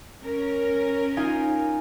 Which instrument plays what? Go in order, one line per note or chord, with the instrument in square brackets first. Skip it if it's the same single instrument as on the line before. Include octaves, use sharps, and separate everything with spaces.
[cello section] C#4 A#4
[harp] D#4 F4 G#5